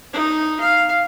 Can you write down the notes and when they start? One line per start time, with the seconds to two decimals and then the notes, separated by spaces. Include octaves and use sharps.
0.13 D#4
0.60 F5